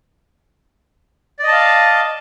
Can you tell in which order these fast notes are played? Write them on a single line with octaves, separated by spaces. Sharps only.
D5 D#5 A5 F5